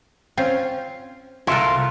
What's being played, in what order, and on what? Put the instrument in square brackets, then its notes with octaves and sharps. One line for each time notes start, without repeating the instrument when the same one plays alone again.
[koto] C4 C#4 F4
[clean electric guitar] C2 F4 [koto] E4 A4 A#4